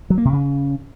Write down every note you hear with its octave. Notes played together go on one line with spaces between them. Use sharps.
F#3
A#3
C3
C#3